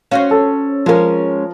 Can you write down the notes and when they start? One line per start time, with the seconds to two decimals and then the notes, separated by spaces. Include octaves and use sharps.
0.11 C#4 F#4 C5 F5
0.31 A4
0.86 F3 G#3 C#4 A#4